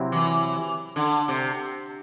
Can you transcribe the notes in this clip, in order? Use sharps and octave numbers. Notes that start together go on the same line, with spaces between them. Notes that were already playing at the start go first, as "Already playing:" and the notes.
Already playing: C3 F#3 C4 E4
E3
D3
C3